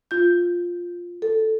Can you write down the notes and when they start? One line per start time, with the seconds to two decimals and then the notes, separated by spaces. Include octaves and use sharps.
0.11 F4 G6
1.22 A4